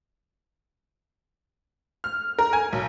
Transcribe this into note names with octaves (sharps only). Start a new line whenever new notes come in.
F6
A#4
G#5
B1